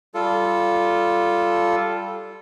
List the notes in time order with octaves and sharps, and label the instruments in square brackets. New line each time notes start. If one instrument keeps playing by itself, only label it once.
[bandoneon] G3 F4 A4